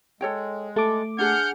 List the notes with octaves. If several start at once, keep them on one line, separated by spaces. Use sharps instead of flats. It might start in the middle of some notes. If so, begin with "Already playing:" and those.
G#3 A4 C#5 G5
A3 A4 D6
D4 G#4 F#5 F6 G6